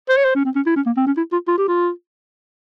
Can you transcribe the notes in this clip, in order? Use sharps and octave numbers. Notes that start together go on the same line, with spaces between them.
C5
C#5
C5
C#4
C4
C#4
E4
C#4
A#3
C4
C#4
E4
F4
F4
G4
F4